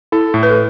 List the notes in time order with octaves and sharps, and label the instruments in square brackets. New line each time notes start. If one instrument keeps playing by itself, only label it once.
[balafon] E4 [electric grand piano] A4
[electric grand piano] A2
[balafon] B4
A4